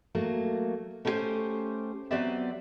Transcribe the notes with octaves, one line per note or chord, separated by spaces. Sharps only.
F#3 A3 A#3
A3 C#4 E4 G4 C5 G#5
F#3 B3 C4 G4 D5 E5